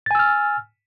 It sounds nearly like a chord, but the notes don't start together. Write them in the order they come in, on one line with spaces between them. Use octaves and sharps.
A6 G#5 E6 F6